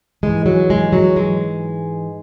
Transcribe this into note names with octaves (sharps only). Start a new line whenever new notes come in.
G#2 E3 G#3
F#3
G#3
F#3
G#3